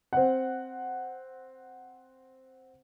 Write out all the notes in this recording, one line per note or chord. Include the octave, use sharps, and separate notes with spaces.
C4 F#5